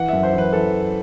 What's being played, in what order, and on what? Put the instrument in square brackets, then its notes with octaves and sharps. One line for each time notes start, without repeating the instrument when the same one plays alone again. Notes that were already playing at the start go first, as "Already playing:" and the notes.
Already playing: [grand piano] E3 F#5
F#2 E5
C5
E3
B4
E3 A4